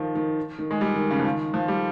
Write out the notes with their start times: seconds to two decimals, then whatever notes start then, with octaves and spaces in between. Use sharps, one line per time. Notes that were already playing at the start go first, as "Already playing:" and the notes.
Already playing: D#3 F3
0.15 D#3
0.59 D#3
0.71 G#3
0.81 G3
0.96 D#3
1.11 C#3
1.19 F3
1.25 D#3
1.54 F3
1.68 G3